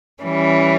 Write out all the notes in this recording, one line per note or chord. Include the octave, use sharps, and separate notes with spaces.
E3 G3 C#4